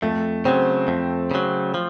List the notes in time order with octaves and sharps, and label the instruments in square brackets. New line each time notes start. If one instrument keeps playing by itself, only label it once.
[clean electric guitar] F2 [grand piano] A3
[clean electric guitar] C#3 F#3 [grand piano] C4
[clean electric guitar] F2
C#3 F#3
F3